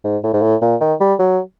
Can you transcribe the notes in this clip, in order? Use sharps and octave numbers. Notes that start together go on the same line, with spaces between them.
G#2
A2
G#2
A2
A#2
D#3
G3
F#3